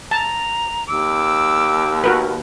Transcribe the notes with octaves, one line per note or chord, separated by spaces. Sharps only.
A5 A#5
D#2 D6 E6
F#4 A#4 B4